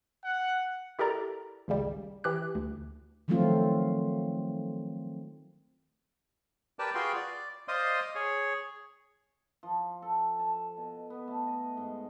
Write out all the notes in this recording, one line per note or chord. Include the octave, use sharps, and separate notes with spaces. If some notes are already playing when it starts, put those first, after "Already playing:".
F#5
E4 G4 A4 A#4 D5 A#5
G#1 C#2 C#3 G3
E3 G4 F#6
D2
D#3 F3 F#3 A3 C4 F4
G4 A#4 B4 D5 G5 A5
F4 F#4 G#4 B4 G5 C6
D5
C5 D5 D#5 F5 C6 D#6
G#4 C#5
F3
A4
A5
B2
B3
A3
D#5
G#2